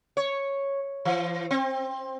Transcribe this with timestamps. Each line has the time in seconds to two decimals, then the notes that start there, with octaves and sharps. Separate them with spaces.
0.17 C#5
1.05 E3
1.51 C4